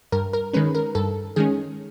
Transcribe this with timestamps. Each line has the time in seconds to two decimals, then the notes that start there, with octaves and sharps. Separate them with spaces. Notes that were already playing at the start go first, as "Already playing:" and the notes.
0.12 G2 A#4
0.33 A#4
0.53 D#3 G#3 C#4 B4
0.75 A#4
0.95 G2 A4
1.36 D#3 G#3 C#4 G#4